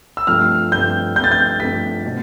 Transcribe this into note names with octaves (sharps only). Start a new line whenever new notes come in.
E6
G2 F3 A3 C4 F6
G2 F3 A3 C4 G6
G2 F3 A3 C4 G6
A6
G6
G2 F3 A3 C4 B6
B2